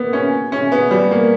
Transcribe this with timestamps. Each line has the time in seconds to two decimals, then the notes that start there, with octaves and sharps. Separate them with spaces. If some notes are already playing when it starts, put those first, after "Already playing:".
Already playing: A#3 B3
0.13 C#4
0.52 C#4
0.72 B3
0.91 G3
1.11 A#3